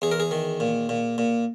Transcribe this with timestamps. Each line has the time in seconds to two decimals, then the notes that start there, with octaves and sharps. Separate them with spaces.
0.02 E2 G#4
0.11 A#4
0.20 G#4
0.31 D#3
0.60 A#2
0.89 A#2
1.18 A#2